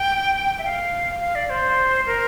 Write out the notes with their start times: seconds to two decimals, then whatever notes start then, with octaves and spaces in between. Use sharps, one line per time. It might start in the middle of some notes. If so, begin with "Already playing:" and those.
Already playing: G5
0.58 E5
0.64 F5
1.21 F5
1.35 D5
1.50 C5
2.06 A#4